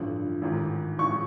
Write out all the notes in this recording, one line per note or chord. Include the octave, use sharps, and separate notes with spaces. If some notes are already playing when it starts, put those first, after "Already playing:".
Already playing: A1 G2 D3 F3
A1 G#2 D#3
A1 G#2 F3 C#6